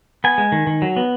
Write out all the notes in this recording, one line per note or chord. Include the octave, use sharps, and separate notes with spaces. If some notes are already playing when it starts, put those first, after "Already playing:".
B3 G#5
G#3
D#3
D#3
F#3
B3